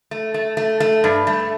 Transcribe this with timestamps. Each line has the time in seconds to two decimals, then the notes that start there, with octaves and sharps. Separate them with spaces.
0.11 A3
0.34 A3
0.57 A3
0.80 A3
1.04 G2
1.27 A3